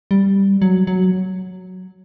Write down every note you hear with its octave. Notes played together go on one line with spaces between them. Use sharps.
G3
F#3
F#3